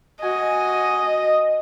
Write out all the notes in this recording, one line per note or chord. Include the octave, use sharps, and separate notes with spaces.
F#4 D#5 G#5